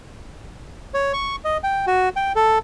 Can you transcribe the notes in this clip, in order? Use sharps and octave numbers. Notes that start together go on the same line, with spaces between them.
C#5
C#6
D#5
G5
F#4
G5
A4